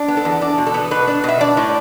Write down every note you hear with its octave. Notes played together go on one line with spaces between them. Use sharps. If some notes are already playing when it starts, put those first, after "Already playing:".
Already playing: D4
B3
A4
E2
D4
B2
A4
B3
B2 B4
D4
B2 E5
D4 D5
A2